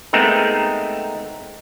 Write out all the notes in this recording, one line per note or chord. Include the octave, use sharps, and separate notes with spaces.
G#3 A3 B3 C4 D#4 A#4